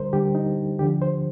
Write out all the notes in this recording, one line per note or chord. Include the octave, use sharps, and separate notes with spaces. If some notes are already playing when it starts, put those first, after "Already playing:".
Already playing: D2 D3 G3 A#4 C5
D2 D3 G3 G4
D#4
D2 D3 F3 G4
C5